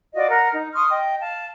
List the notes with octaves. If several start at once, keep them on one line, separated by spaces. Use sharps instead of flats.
F4 F#4 D5 D#5
A#4 F#5
D#4
C6 C#6 D#6 F6
D#5 G5
F5 A5